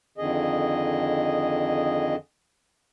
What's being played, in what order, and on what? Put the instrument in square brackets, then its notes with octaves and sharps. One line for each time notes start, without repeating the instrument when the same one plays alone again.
[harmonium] F2 D3 D#3 G#4 D#5